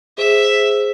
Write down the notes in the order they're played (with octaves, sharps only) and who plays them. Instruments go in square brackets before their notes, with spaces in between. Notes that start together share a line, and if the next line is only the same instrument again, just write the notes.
[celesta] G#4 C5 [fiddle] E5